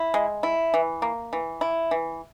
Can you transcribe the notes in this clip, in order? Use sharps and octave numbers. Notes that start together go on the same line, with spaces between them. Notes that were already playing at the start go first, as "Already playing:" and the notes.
Already playing: E4
G#3
E4
E3
A#3
E3
E4
E3